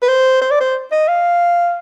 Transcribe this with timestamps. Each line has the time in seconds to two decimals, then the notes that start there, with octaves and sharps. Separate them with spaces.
0.02 B4
0.08 C5
0.41 C5
0.51 D5
0.61 C5
0.92 D#5
1.08 F5